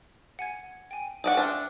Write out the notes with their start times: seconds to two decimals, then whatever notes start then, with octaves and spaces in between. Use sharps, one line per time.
0.39 F#5 G#5 G#6
0.91 G5 G#5
1.24 G#4 C5 D5 F#5 G5 C#6
1.37 D4 C5 E5 E6 F6